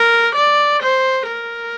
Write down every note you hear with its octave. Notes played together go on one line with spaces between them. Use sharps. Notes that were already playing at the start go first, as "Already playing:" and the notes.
Already playing: A#4
D5
C5
A#4